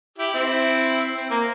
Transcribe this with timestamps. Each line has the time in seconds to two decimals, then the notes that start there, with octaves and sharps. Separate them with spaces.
0.18 E4 G4
0.34 C4 E4
1.14 C4
1.30 A#3